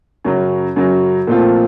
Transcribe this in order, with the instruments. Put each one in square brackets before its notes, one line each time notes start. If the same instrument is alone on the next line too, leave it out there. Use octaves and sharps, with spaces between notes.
[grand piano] F#2 C#3 F#3
F#2 C#3 F#3
A#2 F3 A3 C4 F4